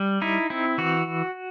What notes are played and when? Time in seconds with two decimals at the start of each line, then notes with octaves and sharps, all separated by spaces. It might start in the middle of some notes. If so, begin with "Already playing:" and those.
Already playing: G3
0.21 D#4 E4
0.50 C4 E4
0.78 E3 F#4